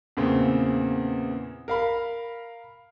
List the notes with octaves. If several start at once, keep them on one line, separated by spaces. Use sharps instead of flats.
E2 A#2 C#3 C4
A#4 F5 B5